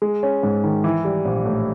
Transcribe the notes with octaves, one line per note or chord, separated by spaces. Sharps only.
G#3
C#4
G#2
D#3
E3
G3
A#1
A2